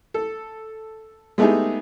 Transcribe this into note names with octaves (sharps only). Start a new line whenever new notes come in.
A4
G#3 A3 B3 D#4 G4 G#4